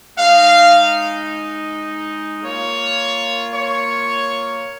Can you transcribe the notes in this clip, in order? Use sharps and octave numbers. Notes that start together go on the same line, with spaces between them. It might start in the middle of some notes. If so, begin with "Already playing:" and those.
G#3 D#4 F5
A#3 F4 C#5
C#5